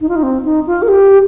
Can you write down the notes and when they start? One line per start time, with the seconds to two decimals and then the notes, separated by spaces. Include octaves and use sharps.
0.01 D#4
0.09 F4
0.16 D#4
0.23 C4
0.45 D#4
0.67 F4
0.82 A#4
0.88 G4